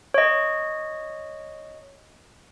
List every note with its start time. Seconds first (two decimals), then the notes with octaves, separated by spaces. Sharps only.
0.14 C#5 D#5